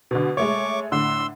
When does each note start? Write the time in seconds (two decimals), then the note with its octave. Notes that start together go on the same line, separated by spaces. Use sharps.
0.11 B2 D3
0.37 G#3 A3 C#5 C#6 D6
0.92 A2 D3 C6 E6